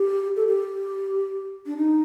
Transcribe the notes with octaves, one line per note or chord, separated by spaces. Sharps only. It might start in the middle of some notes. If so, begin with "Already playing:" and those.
Already playing: G4
A4
G4
D4
D#4